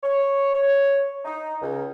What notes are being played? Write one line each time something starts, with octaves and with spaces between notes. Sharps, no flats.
C#5
C#5
D#4
C#2